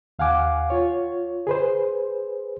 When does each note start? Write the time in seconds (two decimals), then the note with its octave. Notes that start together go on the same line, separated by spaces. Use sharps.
0.19 D#2 F5 F#5 G#5 D6
0.70 F4 C#5
1.47 G#4 B4 C5